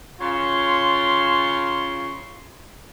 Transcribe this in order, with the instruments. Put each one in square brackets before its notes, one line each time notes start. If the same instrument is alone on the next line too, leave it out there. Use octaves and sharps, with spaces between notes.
[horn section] C#3 F4 C#5 C6